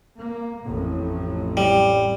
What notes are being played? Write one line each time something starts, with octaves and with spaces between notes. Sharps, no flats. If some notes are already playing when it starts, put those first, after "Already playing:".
A#3
A1 F2 A2
G3